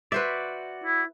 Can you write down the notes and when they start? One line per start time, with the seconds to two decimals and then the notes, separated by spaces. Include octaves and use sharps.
0.12 F#4 B4 C5 D5 E5
0.84 E4